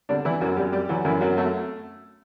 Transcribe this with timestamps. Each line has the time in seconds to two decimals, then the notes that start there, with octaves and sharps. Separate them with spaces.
0.09 D3 G3 D4
0.25 E3 E4
0.41 F#2 F#3 F#4
0.57 F#2 G3 G4
0.73 G3 G4
0.89 E3 F#3 F#4
1.05 F#2 E3 E4
1.21 F#2 F#3 F#4
1.37 F#3 A3 F#4